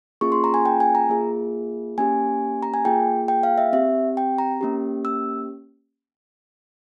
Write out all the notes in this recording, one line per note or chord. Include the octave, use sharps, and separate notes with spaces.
A#3 C#4 F4 G#4 C#6
C6
A#5
G#5
G5
G#5
A#5
A#3 F4 G#4
A#3 C#4 G4 G#5
A#5
G#5
A#3 F4 G#4 G5
G5
F5
E5
C4 G4 E5
G5
A#5
A#3 C#4 G4
E6